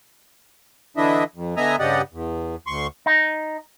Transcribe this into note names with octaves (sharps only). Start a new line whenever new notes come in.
D3 E3 D4 E4 D#5 E5
F2
D3 B3 D#5 E5 G#5 A#5
G2 C#3 G4 D5 D#5 F#5
E2
D2 C6 C#6
D#4